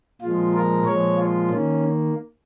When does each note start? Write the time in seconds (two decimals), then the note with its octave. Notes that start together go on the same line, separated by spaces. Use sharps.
0.22 A#2 F3 G#3 F4
0.54 A#4
0.86 A#2 F3 G#3 C#5
1.18 F4
1.50 D#3 A#3 C#4